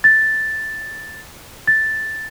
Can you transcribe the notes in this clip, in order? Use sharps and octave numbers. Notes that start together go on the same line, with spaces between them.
A6
A6